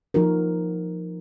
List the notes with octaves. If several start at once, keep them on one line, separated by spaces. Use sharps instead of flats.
F3 D#4 F#4 A#4